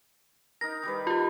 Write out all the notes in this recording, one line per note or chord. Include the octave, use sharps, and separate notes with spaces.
D#4 A#4 A#6
D#3 G3 B4
F4 G4